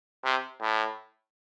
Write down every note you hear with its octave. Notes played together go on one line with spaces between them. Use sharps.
C3
A2